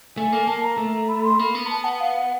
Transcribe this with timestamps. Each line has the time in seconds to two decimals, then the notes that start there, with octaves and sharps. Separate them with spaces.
0.17 A3 G#5
0.32 A#3
0.47 A#3 A5
0.63 A#5
0.78 A3
1.09 B5
1.24 C6
1.39 A#3 B5
1.55 B3
1.65 A#5
1.70 A5
1.84 F#5
2.00 F5
2.16 F#5